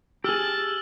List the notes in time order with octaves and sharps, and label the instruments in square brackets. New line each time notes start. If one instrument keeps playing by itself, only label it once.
[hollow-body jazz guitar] G4 G#4 [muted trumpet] A5 [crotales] E6 F6 F#7